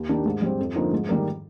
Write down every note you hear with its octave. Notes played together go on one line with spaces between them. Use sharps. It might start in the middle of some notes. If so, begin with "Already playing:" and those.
Already playing: D#2
D#3 A#3 D4 G4
G#2
G3 C4
F2
D3 F3 A#3 D#4
G#2
D#3 G3 A#3